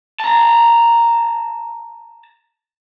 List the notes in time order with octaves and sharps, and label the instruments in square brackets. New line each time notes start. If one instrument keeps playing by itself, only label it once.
[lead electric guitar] A5 A#5